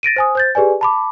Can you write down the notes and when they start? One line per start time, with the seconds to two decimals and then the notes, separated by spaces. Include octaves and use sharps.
0.03 A6 A#6 D7 D#7
0.16 C5 G#5 D#6
0.35 C5 G6 A6
0.55 G4 G#4 B4 D5 G#5
0.81 A5 B5 D6